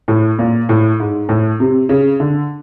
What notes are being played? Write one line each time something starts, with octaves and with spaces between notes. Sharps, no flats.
A2
A#2
A2
G#2
A2
C3
C#3
D3